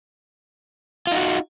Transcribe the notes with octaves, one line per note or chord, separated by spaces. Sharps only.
D#4 F4 F#4